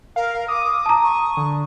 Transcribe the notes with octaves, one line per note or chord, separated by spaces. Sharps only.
A#4 F5
D6 D#6
A5 A#5
C#6
D3